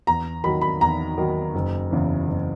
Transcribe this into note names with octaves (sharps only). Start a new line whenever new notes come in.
E2 A#5
D#3 F#3 B5
B5
E2 A#5
D#3 F#3
F#1
E2 C#3 E3
F#1